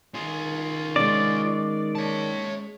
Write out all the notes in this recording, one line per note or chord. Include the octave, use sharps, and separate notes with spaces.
D#3 F4 G#4
G#3 C#4 D5
C#5 A5